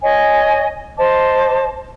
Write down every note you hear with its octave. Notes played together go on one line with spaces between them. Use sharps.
C#5 D#5 G#5
C5 D#5 A5 D6